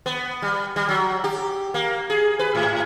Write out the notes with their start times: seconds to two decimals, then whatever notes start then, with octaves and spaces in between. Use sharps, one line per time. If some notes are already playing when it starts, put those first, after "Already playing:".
0.06 B3
0.42 G3
0.76 G3
0.89 F#3
1.24 G4
1.74 A#3
2.10 G#4
2.39 B4
2.55 G#2